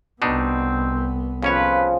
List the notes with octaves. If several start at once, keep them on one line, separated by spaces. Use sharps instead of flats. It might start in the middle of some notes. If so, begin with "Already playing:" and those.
C2 B2 B3 C4 D4 D#4
F2 C#3 F3 C#4 B4 C#5